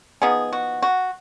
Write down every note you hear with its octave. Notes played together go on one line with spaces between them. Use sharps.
F3 B3 D#4 G#4
F#4
F#4